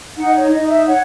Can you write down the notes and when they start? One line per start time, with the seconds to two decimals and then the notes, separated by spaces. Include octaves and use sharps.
0.16 D#4 F#5
0.26 D#5
0.35 C#5
0.51 D#4 D#5
0.69 E5
0.87 C#5 F#5